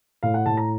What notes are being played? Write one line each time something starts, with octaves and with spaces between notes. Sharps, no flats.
A2 F5
F#5
A2 A5
A#5